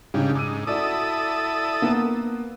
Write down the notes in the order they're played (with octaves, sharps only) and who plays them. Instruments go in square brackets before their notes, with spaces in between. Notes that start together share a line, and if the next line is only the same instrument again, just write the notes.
[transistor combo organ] G#2 G3 [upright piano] C#3 D4
[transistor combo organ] G#2 [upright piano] D6 E6 D#7
[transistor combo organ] E4 A4 D#6 [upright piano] F#4 D5
[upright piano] A#3 B3